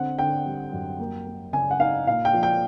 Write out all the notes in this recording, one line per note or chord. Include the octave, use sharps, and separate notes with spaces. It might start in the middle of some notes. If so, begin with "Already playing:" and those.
Already playing: D3 C4 F#5
D3 G5
G3
F#2
A#3
A#3
C#3 G#5
F#5
D#4 F5
A#2 F5
G5
F3
G5